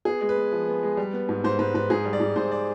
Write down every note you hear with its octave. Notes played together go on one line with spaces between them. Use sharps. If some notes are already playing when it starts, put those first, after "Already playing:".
B3 G#4
G#3
B4
B3
F3
B3
G#3
G3
B3
G#2
G#2 C5
G#2 B4
G#2 B4
G#2 G#4
G3
D5
G#2
G#2 C5
D5